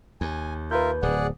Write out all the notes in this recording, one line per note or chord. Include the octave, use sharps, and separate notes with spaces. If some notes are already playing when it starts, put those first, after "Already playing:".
D#2 G#5
F4 A#4 B4 E5 G6
D1 G#4 D5 F#5